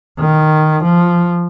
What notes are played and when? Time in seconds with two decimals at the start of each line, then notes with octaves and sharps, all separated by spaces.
0.20 D#3
0.84 F3